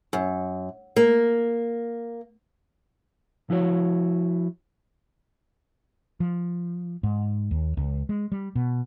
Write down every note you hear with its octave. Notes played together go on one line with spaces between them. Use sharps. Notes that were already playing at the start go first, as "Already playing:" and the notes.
F#2
A#3
F3 E4 F#4 C#5
F3
G#2
D#2
C#2
G#3
G3
B2